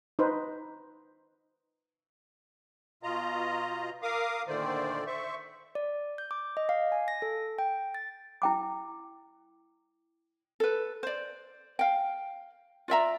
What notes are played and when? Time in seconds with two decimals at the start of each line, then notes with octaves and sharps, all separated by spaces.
0.19 D#4 B4 C5
3.03 B2 F4 D#5 A#5
4.02 A#4 F5 D6 D#6
4.48 A#2 D3 D#3 A3 C5 D5
5.07 C5 E5 C#6
5.75 D5
6.18 G6
6.31 D6
6.57 D#5
6.69 F5
6.92 G#5
7.08 A#6
7.22 A4
7.58 G5
7.94 A6
8.42 E4 G5 D6
10.60 A4 B4
11.03 C5 D5
11.79 F5 G5
12.88 F4 D5 E5 A#5